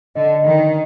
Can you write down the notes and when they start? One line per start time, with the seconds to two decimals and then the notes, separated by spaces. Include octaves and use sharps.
0.15 D3 D#5
0.36 D#5
0.45 D#3
0.56 D#5